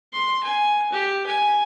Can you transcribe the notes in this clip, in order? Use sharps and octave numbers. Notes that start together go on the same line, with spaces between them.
C6
G#5
G4
G#5